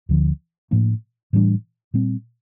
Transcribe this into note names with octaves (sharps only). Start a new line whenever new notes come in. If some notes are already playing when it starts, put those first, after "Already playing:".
D2 D3 F3
A2 F3 A#3 D4
A2 E3 G3 D4
A#2 G3 C4